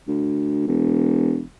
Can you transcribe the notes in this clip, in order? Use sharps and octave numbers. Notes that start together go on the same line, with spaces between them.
D2
E1